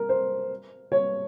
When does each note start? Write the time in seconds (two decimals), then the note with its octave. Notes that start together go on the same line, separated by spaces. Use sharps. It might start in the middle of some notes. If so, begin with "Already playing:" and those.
Already playing: A#4
0.09 C5
0.92 C#5